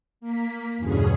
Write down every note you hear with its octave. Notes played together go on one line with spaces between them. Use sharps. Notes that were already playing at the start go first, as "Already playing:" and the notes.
A#3 B6
E2 G2 B2 D3 C#4 G#4